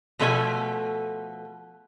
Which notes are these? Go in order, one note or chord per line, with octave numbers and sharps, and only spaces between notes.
B2 F3 A3 A4 C#5 G#5